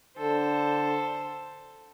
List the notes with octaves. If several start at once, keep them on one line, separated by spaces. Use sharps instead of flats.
D3 A4 C5